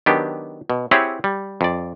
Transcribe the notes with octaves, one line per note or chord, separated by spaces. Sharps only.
D#3 F#3 B3 D4 G4
B2
C4 E4 G4 G#4 C#5 F#5
G3
F2 D5